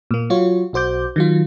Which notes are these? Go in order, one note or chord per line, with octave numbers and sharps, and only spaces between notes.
A#2 A#3
F#3 F4 F#4 C#5
B1 F#4 C5 D6 G6
D#3 F#3 F4